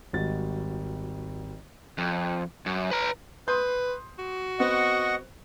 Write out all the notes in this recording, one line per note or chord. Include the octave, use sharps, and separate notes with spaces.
G#1 G3 F#4 D#5 A6
F2
F#2
B4 A#5
B4 C6 D#6 G6
F#4
B3 C4 D#5 F#5 C#6